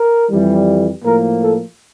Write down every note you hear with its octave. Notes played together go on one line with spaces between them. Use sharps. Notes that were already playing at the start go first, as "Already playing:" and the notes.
Already playing: A#4
F2 E3 G3
A2 F3 A#3 A#4
A4